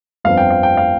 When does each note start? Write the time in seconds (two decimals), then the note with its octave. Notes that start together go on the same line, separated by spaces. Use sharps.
0.24 G1 F2 F3 C4 F5
0.37 G5
0.50 F5
0.63 G5
0.77 F5